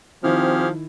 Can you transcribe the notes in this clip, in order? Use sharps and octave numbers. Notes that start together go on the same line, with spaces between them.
D#3 F3 C4 E4 G4 G#4 F6